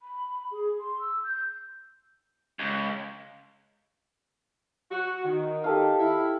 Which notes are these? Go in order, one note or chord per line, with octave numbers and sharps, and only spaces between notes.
B5
G#4
C6
E6
G6
C#2
F#4
D#3
G4 A4 F5
E4